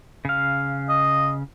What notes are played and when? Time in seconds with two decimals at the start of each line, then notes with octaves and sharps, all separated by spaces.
0.25 C#3 F5
0.89 D#5